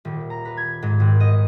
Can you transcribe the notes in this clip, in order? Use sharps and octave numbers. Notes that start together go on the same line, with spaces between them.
D#1
A#5
B4
G#6
G#2
G#1
D#5